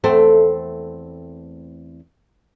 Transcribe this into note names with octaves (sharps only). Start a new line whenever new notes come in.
E2 A3 C4